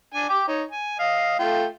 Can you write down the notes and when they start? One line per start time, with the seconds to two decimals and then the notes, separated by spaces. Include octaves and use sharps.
0.14 D4 G#5
0.29 G5 D6
0.48 D#4 C#5
0.72 G#5
0.99 D#5 F5
1.39 A3 F4 G5